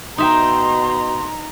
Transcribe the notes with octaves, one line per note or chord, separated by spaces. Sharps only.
B2 D#4 E5 G5 A#5 C6